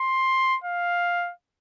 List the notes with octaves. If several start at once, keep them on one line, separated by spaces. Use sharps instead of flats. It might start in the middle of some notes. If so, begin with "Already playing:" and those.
Already playing: C6
F5